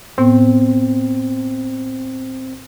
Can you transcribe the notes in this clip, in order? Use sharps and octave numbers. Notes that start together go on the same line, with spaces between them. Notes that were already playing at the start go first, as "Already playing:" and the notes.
A2 B3 C4